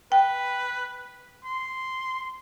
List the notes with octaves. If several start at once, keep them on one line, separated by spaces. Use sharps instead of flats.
B4 G5
C6